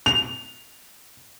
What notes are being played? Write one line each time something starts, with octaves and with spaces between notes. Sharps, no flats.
F7